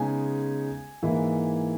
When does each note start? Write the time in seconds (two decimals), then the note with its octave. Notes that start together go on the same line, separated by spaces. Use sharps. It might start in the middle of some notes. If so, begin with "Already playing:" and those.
Already playing: C#3 G#3 B3 D#4 G#5
1.02 G#2 E3 A#3 E4